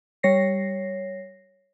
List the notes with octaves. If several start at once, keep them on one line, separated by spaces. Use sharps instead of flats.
G3 C#5 A#6 C7